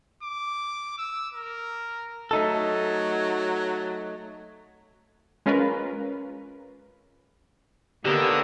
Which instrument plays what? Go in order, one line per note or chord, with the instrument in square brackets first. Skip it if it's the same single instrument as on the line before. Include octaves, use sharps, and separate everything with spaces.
[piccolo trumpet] D6
E6
A#4
[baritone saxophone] F#3 [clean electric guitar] A3 D#4 A4
[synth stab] G#3 C#4 F4 A#4 B4
[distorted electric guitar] D3 [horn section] D#3 B3 C#5 [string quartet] A#3 A#4 [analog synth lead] G4